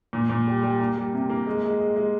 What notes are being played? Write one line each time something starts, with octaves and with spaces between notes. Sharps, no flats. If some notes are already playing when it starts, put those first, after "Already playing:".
A#2
A#2
G3
G3
A#3
G3
C3
A#3
G#3
G#3
G#3
G#3